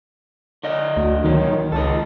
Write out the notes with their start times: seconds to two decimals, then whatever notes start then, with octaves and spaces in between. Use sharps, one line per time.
0.63 D3 D4 D#5
0.97 D2
1.24 A#2 D#3 F#3
1.72 C#2 D#4 A4